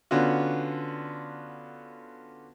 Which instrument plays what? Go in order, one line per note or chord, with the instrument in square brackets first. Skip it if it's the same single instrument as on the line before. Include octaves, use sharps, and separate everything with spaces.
[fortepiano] D3 B3 C#4 F4 F#4